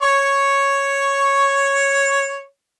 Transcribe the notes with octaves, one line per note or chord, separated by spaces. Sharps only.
C#5 C#6